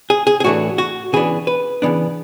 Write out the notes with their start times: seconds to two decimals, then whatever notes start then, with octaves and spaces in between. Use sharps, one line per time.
0.10 G#4
0.27 G#4
0.40 G#4
0.44 A2 E3 A3 D4 F#4
0.78 F#4
1.13 C#3 E3 B3 D4 G#4
1.47 B4
1.82 C#3 E3 B3 D4